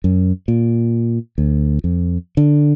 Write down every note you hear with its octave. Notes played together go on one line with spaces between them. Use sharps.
F#2
A#2
D2
F2
D3